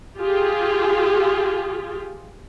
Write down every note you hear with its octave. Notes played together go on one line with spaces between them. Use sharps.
F4 G4 G#4